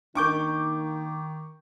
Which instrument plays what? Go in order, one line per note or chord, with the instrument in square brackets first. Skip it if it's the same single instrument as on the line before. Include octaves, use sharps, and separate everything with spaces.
[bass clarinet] D#3 [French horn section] A#3 D#4 [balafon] D4 A#4 [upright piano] C#6 D6 G6